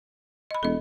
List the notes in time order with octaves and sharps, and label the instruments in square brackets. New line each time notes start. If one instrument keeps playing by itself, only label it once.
[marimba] D#5 B5
[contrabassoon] E1 [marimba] A4 D#5